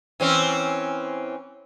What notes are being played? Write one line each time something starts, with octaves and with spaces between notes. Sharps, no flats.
E3 C4 C#4